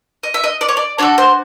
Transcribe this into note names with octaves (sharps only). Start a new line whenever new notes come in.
D#5
E5
D#5
D5
C#5
D5
D4 F#4 A4 C#5
C5